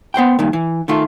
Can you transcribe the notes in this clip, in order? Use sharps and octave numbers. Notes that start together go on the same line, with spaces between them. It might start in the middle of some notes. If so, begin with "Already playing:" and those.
B3 C5 F#5 G5
G2 A#2 D#3
E3
D#3 A3 F4